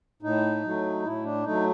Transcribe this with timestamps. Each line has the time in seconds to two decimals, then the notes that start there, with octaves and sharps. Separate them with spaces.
0.22 A2 D#4
0.64 F#3 A3
1.03 A2 E4
1.24 D4
1.44 F#3 A3 D#4